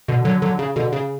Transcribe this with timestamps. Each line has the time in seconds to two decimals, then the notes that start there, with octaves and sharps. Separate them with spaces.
0.08 B2 D3
0.25 D3 F#3
0.42 D3 F#3
0.59 C#3
0.76 B2 D3
0.92 C#3